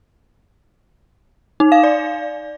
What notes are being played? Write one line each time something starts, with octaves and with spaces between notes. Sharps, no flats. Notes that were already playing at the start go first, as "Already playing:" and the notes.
D#4
F5
D5